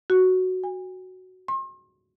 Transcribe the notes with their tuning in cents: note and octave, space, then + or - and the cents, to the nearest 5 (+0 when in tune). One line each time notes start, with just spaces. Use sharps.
F#4 +0
G#5 -40
C6 +40